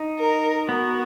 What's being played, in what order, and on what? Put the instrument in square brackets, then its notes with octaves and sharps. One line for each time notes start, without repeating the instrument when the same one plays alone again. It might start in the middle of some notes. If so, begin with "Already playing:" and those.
Already playing: [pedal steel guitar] D#4
[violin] A#4
[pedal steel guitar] B3 [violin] F#4